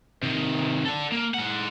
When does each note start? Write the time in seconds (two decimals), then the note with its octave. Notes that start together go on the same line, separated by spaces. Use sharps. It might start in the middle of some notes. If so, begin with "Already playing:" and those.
0.23 C3 D#3
0.85 D3 A4
1.12 A#3
1.34 G#3 F#5